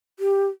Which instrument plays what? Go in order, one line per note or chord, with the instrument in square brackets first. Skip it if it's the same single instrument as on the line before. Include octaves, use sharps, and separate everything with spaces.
[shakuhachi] G4